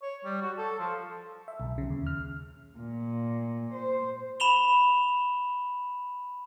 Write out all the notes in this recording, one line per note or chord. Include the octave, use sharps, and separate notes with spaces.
C#5
G3
F#4
A4
F3
E5
B1
C#3
D#2
F6
A#2
C5
B5 E7 F7 G7